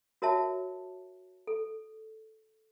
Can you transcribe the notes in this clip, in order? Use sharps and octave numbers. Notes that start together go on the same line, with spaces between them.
F#4 A#4 C#5 E5 A5
A4